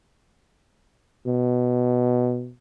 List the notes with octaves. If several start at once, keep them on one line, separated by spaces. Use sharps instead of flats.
B2